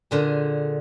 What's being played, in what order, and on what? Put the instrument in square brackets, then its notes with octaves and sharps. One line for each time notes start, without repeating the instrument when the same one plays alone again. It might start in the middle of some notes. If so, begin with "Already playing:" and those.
[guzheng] A#2 D3 G#4